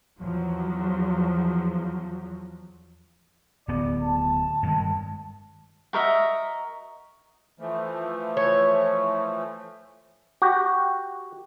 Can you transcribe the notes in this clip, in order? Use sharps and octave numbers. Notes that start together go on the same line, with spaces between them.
E2 F3 F#3
D1 B3 D5
A5
G2 D#3 G#3
F#4 A#4 D#5 E5
E3 F3 A3
C#5
F#4 G4